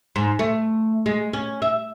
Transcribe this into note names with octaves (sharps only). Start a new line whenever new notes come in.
G#2
A3
G#3
C#4
E5